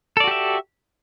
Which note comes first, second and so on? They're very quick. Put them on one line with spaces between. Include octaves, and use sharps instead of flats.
A4 D5 F#4 G4 E5